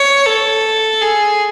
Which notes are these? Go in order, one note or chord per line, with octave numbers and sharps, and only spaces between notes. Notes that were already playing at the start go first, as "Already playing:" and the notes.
Already playing: C#5
A4
G#4